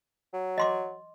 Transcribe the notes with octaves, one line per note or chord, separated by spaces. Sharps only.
F#3
D#5 C6 D6